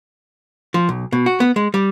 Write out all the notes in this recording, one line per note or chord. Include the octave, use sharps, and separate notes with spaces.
F3
B1
B2
F#4
B3
G#3
G3